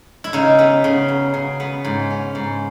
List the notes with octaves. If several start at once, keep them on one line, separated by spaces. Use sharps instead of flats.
E4
C#3 D#4
B3
C#3
F#3
C#3
B3
G#2
C#4
G#2